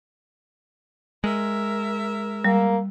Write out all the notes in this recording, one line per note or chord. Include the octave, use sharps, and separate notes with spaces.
G#3 A#4 E5
G3 A#3